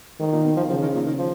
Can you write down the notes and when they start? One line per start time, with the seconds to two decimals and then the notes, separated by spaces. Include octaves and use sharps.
0.20 G#2 D#3
0.32 A#2
0.44 B2
0.56 F3
0.69 C#3 F3
0.82 D#3
0.94 A#2
1.06 D#3
1.19 F3